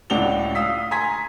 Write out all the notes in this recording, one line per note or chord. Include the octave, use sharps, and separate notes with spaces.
C#2 A2 D4 F#4 F7 G7
F5 D#6 E6 B6
G#5 A#5 C6 G#6 B6